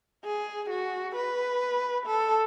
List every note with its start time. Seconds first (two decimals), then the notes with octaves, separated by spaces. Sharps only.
0.24 G#4
0.70 F#4
1.16 B4
2.06 A4